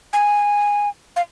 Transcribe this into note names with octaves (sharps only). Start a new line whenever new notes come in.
G#5
F5